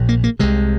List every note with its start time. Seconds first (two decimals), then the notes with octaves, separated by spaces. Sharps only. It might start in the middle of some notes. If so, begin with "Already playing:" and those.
Already playing: A#1 A#2
0.09 A#3
0.24 A#3
0.39 C2 C3 G#3